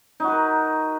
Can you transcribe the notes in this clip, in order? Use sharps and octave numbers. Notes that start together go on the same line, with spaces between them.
D#4 F#4 A#4 B4